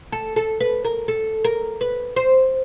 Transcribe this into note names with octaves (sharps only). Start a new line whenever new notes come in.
A4
A4
B4
A#4
A4
A#4
B4
C5